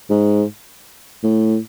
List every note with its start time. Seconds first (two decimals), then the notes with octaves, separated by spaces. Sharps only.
0.10 G#2
1.24 A2